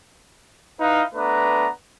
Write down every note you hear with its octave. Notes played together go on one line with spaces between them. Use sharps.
D#4 E4 B4 F5
A3 B3 D4 B4 A#5